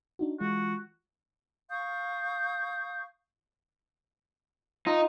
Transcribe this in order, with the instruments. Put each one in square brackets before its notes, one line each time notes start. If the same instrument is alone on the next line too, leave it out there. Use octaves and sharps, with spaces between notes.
[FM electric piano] D4 D#4 F#4
[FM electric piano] E3 G#3 F4 [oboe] F#4
[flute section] F5 C#6 D#6 G6
[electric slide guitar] D#4 [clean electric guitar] F4